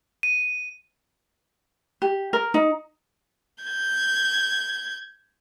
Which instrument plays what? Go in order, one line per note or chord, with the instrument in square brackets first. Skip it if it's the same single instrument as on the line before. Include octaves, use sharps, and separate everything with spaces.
[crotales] D#7
[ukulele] G4
A#4
D#4
[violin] G6 G#6